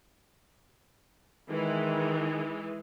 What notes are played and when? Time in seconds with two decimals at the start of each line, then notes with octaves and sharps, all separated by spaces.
1.50 D#3 E3 G#3